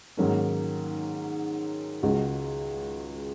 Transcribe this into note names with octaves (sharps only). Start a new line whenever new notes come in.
G#2 D#3 F#3 A#3 C#4
C#2 C#3 G#3 F#4